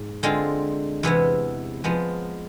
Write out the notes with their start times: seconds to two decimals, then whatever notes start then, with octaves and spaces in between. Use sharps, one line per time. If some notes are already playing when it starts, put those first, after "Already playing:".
Already playing: G#2
0.23 D3 G#3 C4 F4
1.03 E2 C3 E3 B3 E4
1.84 F3 G#3 B3